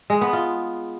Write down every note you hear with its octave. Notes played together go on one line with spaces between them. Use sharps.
G#3
B3
F4